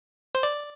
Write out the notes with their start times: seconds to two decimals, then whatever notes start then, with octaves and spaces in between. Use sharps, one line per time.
0.35 C5
0.43 D5